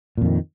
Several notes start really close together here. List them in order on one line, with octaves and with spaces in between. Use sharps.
A#2 F2 D#3